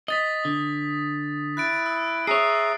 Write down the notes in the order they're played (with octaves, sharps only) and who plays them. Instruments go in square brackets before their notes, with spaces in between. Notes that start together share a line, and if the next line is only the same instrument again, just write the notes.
[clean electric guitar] D#5 [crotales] D#6 A6 B6
[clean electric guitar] D3
[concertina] E4 [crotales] F#6 A6 D7
[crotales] E6
[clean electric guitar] G#4 C#5 [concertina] E5 A#5 D#6 [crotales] C7